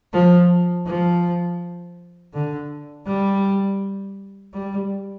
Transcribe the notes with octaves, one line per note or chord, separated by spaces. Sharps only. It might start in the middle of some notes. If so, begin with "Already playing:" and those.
F3
F3
D3
G3
G3